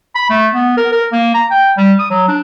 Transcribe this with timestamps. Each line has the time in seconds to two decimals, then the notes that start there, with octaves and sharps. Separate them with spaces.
0.15 B5
0.30 A3
0.54 B3
0.77 A#4
0.92 A#4
1.12 A#3
1.34 A#5
1.51 G5
1.77 G3
1.99 D#6
2.10 F#3
2.28 D4